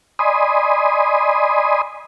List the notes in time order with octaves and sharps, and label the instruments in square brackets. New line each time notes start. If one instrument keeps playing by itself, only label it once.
[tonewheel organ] D5 D#5 G#5 B5 C6 D#6